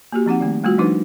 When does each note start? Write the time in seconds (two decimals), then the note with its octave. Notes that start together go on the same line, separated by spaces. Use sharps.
0.12 A#3 F#4 G4
0.26 F3 C4 D#4 F#5
0.40 D#3 G3 A3
0.64 G3 A3 F4 F#4
0.78 F3 G3 D4 D#4 B4 C5